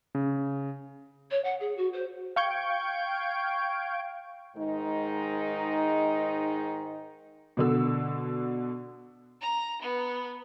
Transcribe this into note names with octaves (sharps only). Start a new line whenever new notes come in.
C#3
C#5
F#5
G#4
F#4
C5
F5 G5 C#6 G6 G#6 D7
G#2 D#3 G#3 D#4
B2 D3 E6
A#5
B3